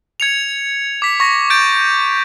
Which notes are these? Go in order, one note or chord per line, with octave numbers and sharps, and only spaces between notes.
G#6 C#7 F7
D6 B6
C#6 A#6
G6 A6 D7